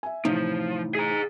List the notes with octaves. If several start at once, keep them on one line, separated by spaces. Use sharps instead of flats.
E5 G#5
A2 C3 E3 F3 D#4
G#4 A#5